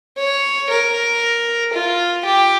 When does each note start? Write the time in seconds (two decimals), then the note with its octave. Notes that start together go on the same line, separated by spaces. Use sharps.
0.18 C#5
0.70 A#4
1.74 F4
2.25 G4